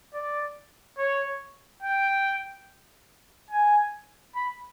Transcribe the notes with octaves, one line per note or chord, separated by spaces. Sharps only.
D5
C#5
G5
G#5
B5